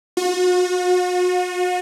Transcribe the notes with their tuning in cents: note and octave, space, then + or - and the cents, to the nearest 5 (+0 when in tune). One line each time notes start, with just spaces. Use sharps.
F#4 -40